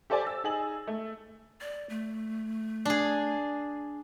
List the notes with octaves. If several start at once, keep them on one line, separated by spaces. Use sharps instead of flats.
G4 A4 C5 D5 G#5 A5
E6 A6
D#4 G#4 F#7
A3
D5
A3
D4 G#4